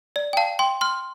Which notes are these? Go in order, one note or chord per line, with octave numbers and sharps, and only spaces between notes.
D5
G5
F5 A5
G5 C6
C6 F6